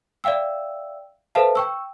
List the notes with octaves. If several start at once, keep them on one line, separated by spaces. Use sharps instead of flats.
D5 E5 F5 G5 E6
A4 B4 C5 E5 F5 A5
G5 C#6 E6